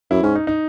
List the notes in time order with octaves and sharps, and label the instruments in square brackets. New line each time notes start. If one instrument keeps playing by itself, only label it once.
[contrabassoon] F#2 [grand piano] E4
[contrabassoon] G#2 [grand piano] C#4
[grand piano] D#4
D#4